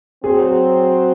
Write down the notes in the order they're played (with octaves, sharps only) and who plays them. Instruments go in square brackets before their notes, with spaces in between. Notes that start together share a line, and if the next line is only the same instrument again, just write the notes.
[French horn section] F#3 C4 F#4 [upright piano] G#4